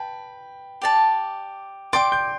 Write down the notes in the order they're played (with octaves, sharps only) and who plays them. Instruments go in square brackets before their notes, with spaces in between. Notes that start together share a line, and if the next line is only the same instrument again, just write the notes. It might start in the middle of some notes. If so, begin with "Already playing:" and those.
Already playing: [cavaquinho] B4 A5 [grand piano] G5
[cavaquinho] G4 D5 A5
[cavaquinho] D5 G5 D6 [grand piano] C6
[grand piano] G6